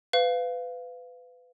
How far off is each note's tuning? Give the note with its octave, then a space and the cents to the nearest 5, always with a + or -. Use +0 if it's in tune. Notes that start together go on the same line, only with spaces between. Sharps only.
B4 +25 F5 +0